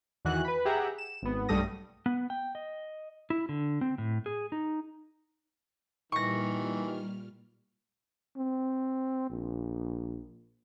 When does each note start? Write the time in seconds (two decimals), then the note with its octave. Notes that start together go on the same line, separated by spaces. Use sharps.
0.25 E2 D#3 E3 F#4 F#6
0.44 B4 B5
0.65 G4 G#4 E5 F#5 A#5
0.98 E7
1.22 G#1 B3
1.49 B1 G2 G3 A3 D#6 A#6
2.06 B3
2.30 G5
2.55 D#5
3.30 E4
3.49 D3
3.81 C4
3.98 A2
4.26 G#4
4.52 D#4
6.12 A#2 D#3 E3 G3 C#6 F6 A#6
8.37 C4
9.30 A#1